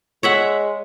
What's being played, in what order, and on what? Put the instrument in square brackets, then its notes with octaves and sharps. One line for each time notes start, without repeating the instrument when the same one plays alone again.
[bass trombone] G#3 [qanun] C#5 E5 F#5